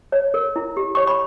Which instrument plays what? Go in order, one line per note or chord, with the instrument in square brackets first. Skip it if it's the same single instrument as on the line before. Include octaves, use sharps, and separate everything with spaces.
[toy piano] C#5
A#4
E4
G4
C#5 C#6
B5